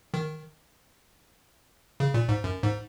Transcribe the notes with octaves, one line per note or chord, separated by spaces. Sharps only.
D#3
C#3
A#2
G#2
F#2
G#2